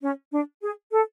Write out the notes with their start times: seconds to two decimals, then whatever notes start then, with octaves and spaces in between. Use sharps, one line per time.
0.02 C#4
0.32 D4
0.62 G#4
0.92 A4